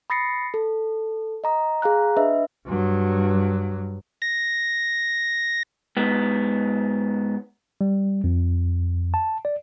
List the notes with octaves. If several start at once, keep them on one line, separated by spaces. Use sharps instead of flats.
B5 D#6 A6 A#6 C7 C#7
A4
D#5 A#5 D#6
G#4 F5 A#5 F#6
D4 B4 D#5 E5
G2 F#3
A#6
G#2 B3
G3
F2
A5
D5